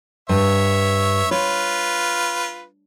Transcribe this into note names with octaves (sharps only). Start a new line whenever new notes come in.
G2 C#5 E5
F4 B4 C#5